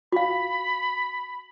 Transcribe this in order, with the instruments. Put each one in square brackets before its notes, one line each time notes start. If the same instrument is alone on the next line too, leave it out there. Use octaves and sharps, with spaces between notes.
[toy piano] F#4 F5 [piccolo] B5